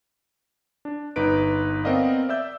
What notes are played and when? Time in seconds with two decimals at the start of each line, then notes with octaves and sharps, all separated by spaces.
0.85 D4
1.16 G1 D#4 B4 D7
1.85 B3 C4 A#4 D5 D#5 F5
2.29 D5 E5 E6 G6